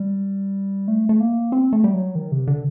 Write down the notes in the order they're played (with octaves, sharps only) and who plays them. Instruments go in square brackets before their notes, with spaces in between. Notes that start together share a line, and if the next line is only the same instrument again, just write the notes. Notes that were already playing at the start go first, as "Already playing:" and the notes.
Already playing: [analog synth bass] G3
A3
A3
A#3
C4
A3
G3
F#3
D#3
C3
D3